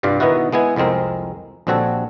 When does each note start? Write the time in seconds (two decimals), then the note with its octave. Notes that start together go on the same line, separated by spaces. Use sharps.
0.03 C2 G2 G3 F4 D5
0.20 B2 D#3 B3 D#4 E4 F#4
0.53 G#3 B3 E4 G#5
0.76 C2 F2 G#3 C4 A#4
1.67 A#1 G3 C4 F#4 A4 C#5